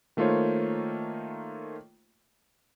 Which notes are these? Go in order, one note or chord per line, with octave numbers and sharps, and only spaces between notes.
D#3 A3 A#3 F4 C5 C#5